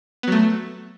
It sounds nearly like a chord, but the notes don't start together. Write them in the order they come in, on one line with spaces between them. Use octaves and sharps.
B3 F#3 A3